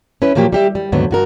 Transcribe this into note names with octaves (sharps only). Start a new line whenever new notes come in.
C#4 E4 B4
A#2 F3 F#3 A#3 G4
G3 G4 E5
G3
D#2 G#2 D3 F#3 B3
G2 F#4 A#4